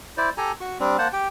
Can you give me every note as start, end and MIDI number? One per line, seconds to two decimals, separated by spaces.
0.17 0.30 64
0.17 0.30 72
0.17 0.30 74
0.37 0.52 67
0.37 0.52 69
0.37 0.52 80
0.37 0.52 82
0.60 0.78 66
0.60 0.78 85
0.80 0.97 55
0.80 0.97 60
0.80 0.97 62
0.98 1.08 58
0.98 1.08 72
0.98 1.08 78
0.98 1.08 81
1.13 1.28 67
1.13 1.28 79